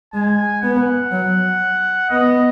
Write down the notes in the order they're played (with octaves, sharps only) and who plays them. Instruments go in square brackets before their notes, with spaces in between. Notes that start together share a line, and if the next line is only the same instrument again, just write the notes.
[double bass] G#3 [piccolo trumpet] G#5
[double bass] B3 [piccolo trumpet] F#5
[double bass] F#3
[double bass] B3 [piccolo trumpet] D#5